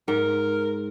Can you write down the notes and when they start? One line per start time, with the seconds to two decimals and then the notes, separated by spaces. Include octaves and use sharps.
0.08 G#2 A#4